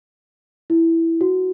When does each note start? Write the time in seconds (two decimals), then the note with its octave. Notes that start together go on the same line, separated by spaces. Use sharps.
0.70 E4
1.21 F#4